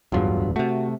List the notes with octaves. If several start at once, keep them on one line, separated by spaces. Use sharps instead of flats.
D1 E2 G2 F#3 F4
C3 A3 F#4